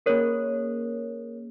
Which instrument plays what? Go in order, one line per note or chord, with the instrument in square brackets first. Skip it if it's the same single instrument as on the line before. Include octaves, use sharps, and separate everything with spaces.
[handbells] A#3 C#4 G#4 A#4 C#5